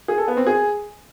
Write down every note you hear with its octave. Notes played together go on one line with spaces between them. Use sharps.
G#4
A4
B3
C4
G#4